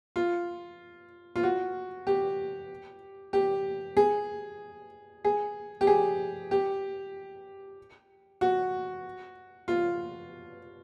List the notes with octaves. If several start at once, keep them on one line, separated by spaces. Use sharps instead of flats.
F4
F4
F#4
G4
G4
G#4
G#4
G4
G#4
G4
F#4
F4